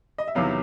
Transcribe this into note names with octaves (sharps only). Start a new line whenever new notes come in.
D#5
E5
E2 C3 D#3 F#3 B3 F5